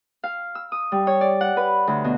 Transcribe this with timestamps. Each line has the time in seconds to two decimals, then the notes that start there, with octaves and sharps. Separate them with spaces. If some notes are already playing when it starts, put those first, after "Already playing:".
0.24 F5
0.55 E6
0.72 D#6
0.92 G3
1.07 C#5
1.21 D5
1.41 F#5
1.57 B4
1.87 D2
2.04 B2